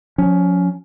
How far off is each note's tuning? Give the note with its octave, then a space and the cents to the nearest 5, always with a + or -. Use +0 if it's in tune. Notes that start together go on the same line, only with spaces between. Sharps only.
F3 +45 C#4 +20